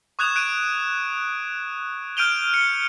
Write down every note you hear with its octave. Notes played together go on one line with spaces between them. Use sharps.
C#6 D#6 F#6 G#6 E7 F7
F#6 D7 D#7
F6 G6 D7 D#7 F7 G7
C#7 G7